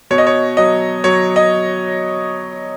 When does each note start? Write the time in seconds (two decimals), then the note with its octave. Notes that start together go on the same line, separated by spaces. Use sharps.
0.11 B2 C#5
0.18 D#5
0.27 C#5
0.57 F#3 D#5
1.04 F#3 C#5
1.36 D#5